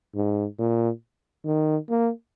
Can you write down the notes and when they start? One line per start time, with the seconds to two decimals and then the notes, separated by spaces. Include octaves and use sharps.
0.15 G#2
0.59 A#2
1.46 D#3
1.90 A#3